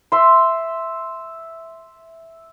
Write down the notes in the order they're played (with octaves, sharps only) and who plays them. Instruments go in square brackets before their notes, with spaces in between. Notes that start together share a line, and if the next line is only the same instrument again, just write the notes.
[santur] E5 C6